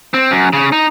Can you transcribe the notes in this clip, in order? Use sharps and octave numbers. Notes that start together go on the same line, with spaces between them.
C4
F#2
C#3
D#4